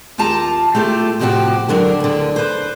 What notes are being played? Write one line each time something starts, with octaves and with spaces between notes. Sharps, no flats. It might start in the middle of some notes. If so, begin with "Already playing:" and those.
D#2 F4 G4 A5 A#5
A3 F4 G4 A4
A2 C3 F3 D#4 F#4 G4
D3 F#3 D4 A#4
D2 D3
B4 C5